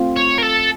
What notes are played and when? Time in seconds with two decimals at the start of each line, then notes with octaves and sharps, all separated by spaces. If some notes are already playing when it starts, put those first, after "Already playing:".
Already playing: A3 C4 F4
0.16 C#5
0.38 A#4
0.42 A4